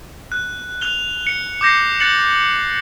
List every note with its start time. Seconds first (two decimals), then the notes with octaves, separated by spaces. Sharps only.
0.32 F#6
0.81 F#6 F7 G7
1.27 C#7
1.61 D6 G6 A#6 C7
2.00 F#6 A6 C#7 F#7